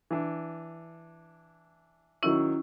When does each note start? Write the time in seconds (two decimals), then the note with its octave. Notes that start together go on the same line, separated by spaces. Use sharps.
0.11 E3 D4
2.23 D#3 F#3 C#4 E4 E5